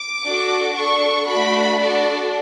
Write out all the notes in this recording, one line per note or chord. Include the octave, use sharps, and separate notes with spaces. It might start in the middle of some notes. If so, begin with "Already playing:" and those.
Already playing: D6
D4 F#4 A4
D4 A4 C#6
A3 D4 F#4 B5
D4 F#4 A4 D5